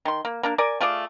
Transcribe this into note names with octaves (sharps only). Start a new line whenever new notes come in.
D#3 C6
A#3
A#3 D4 A#4
A#4 D5 G#5
A3 F4 G#4 D5